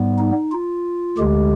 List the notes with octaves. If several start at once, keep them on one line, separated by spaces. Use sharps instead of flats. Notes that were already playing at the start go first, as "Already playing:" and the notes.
Already playing: G#2 G3 B3
D#4
F4
D2 D3 G#3 G4